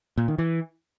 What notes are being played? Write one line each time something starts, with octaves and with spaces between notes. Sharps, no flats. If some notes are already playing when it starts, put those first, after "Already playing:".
A#2
D#3
E3